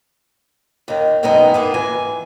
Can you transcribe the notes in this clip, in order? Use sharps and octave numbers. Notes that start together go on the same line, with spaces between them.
D#2 D#3
F#2 B2 D#3 G#3 B3 D#4
A#3 B3 G#4
E3 G#5